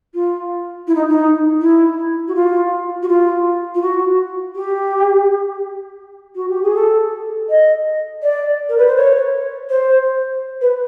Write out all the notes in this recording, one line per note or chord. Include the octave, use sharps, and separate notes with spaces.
F4
E4
D#4
D#4
E4
F#4
F4
F#4
F4
F4
F#4
G4
F#4
G4
G#4
A4
D#5
D5
A#4
B4
C5
C#5
C5
B4